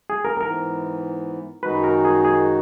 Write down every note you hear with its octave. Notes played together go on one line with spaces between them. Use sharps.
G#4
A#4
G#2 E3 B3 A#4
F#2 D#3 G#3 D#4 F#4 B4
A#4
G#4
G#4